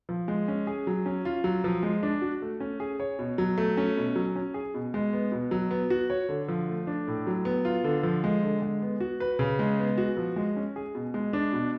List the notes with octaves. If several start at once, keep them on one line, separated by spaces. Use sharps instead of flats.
F3
G#3
C#4
G#4
F#3
C#4
F4
F#3
F3
G#3
D4
F#4
A3
C#4
G#4
C#5
B2
F#3
A3
C#4
B2
F#3
C#4
G#4
B2
G#3
B3
B2
F#3
B3
F#4
C#5
D3
F3
A3
D4
A2
F#3
B3
F4
D3
F3
G#3
D3
G#3
B3
F#4
B4
C#3
G#3
B3
F#4
F3
G#3
C#4
G#4
B2
G#3
D4
B2